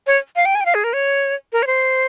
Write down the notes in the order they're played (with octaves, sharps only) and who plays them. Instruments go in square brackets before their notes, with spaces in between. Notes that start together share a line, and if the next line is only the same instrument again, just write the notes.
[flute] C#5
F5
G5
G#5
G5
F5
G#4
A#4
C#5
A#4
C#5
C5